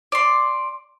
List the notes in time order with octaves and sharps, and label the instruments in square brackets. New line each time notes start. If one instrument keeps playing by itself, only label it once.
[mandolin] D5 C6